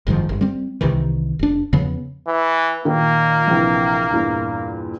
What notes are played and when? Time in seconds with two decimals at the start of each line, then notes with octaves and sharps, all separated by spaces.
0.07 F#1 G#2 D#3 F3
0.29 G1
0.41 G3 C4
0.81 C2 C3 D#3 E3
1.39 F1 D4
1.73 E2 C#3 F3 B3
2.27 E3
2.85 A#2 D#3 A#3
3.48 A#1 C3 E3
4.11 E2 G2 A#2